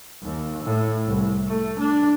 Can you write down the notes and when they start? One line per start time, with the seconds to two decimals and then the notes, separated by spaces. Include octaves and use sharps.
0.23 D#2
0.63 A2
1.06 C2
1.47 A3
1.79 D4